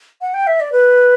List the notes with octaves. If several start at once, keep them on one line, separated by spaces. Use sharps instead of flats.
F#5
G5
E5
D5
B4